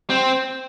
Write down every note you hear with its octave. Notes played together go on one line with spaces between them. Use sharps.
C4